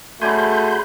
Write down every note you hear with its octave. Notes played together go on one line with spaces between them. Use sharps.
C#3 A3 F#4 D5 G#5 B5 C6 G6